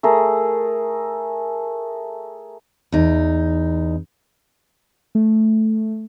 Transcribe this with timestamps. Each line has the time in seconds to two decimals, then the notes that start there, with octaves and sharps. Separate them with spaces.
0.03 A3 G#4 A#4
2.92 E2 D#4
5.15 A3